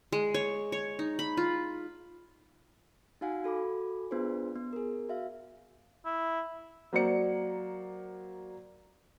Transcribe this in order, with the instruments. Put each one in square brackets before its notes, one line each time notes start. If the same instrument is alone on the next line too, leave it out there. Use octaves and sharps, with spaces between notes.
[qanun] G#3
C#5
C#5
D#4
B5
F4
[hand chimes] D#4 F#4 F5 F#5 G#5
F#4 A4 B5 D6
B3 D4 F4 G#4 B4 C5
B3
G#4 A#4
F#4 E5 F5
[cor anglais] E4
[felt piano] F#3 A#3 C5 D5 C#7